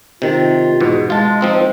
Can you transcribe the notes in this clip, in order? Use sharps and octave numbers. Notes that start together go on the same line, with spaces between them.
C3 D#3 F4
E2 G#2 B2
G#3 F4 A5
F3 C4 D#4